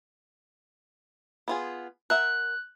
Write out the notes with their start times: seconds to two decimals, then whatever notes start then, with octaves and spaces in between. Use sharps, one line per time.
1.48 B3 F4 G#4
2.10 A#4 E5 F#5 F#6